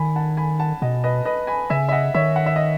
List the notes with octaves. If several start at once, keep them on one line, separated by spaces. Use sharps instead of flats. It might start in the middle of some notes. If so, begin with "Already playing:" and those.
Already playing: D#3 G#5 B5
F#5 A5
G#5 B5
F#5 A5
B2 D#5 F#5
B4 D#5
B4 D#5
G#5 B5
C#3 E5 G#5
E5
D#5 F#5
D#3 C#5 E5
F#5
E5
D#5